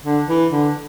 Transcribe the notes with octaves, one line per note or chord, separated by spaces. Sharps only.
D3
E3
D3